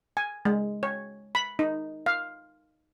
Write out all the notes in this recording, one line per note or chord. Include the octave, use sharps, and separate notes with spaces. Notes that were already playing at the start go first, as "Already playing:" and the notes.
G#5
G#3
C#5
B5
D#4
F5